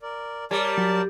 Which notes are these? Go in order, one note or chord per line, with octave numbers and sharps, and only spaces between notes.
A#4 D5
G3 A#4 C#5 D5 A5
F#3